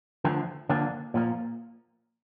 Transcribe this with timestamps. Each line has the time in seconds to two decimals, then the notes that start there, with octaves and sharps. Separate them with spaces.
0.24 D3 F3 A3
0.69 D3 F3 A#3 D4
1.14 A#2 F3 A#3